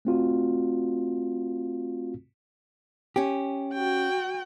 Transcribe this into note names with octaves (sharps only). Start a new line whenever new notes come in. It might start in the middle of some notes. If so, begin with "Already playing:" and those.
A3 C4 F4 F#4
C#4 G4
F#4 G5